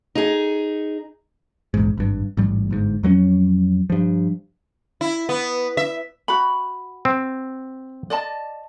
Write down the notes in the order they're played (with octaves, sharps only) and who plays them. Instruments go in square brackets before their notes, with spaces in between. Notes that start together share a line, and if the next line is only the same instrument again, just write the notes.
[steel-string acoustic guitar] D#4 G#4
[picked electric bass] A#1 E2 G#2
G#1 G2
A1 G#2 G3
G1 G#2
F2 F#3 G3 C#4
G2 F3
[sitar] E4
B3
E5
[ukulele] F#4 B5
[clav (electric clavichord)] C4
[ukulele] D5 D#5 A5